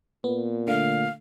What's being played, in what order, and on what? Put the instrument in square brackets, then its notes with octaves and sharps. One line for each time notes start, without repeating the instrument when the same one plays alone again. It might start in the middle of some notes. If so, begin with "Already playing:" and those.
[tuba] A#2 [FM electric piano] B3
[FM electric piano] D3 A3 [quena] F5